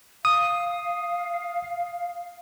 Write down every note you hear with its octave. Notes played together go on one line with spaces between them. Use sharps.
F5 D#6